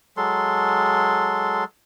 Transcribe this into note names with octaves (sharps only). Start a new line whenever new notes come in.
F#3 G#3 A4 C6